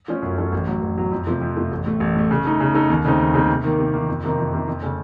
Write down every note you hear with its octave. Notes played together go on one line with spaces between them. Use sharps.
F3 A3 C#4 A4
F#2
F3 A3 C#4 A4
A1
A2 F#3
A1
A2 F#3
F2
C3 F3 A3
F2
C3 F3 A3
A1
A2 A3
A1
A2 A3
C#3
A3 D#4 A4
C#3
A3 D#4 A4
D#2
C#3 A3 C4 D#4
D#2
C#3 A3 C4 D#4
C3
D#3 A#3
C3
D#3 A#3
F2
C3 D#3 A#3 D#4
F2
C3 D#3 A#3 D#4
F2
C#3 A3 C#4 A4